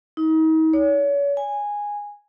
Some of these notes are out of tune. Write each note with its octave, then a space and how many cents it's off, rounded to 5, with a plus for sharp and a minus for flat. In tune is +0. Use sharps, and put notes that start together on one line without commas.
D#4 +40
C#5 +35
G#5 -10